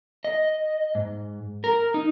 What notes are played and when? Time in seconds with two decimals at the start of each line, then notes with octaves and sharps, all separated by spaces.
0.24 D#5
0.95 G#2
1.64 A#4
1.94 D#4